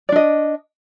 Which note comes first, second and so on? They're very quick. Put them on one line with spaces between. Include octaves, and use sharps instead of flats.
D5 D4 D#5